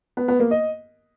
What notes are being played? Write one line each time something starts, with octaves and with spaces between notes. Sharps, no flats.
B3
B3
A#3
D#5